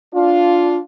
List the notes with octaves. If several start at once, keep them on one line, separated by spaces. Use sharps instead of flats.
D4 F4